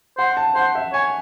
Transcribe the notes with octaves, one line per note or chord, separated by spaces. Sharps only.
C5 F#5
A5
C5 F#5
E5
C#5 G#5